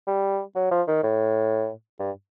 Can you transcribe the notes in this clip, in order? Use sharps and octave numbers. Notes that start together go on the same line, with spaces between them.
G3
F#3
F3
D#3
A2
G2